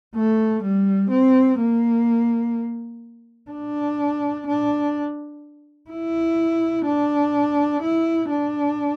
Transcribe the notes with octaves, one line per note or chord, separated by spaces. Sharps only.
A3
G3
C4
A#3
D4
D4
E4
D4
E4
D4